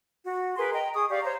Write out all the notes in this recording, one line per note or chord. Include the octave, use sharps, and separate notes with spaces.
F#4
G#4 A#4 B4 C6
D#5 G5 A#5
G#4 C#6 D#6
G4 D5 F5 C#6
C5 C#5 A#5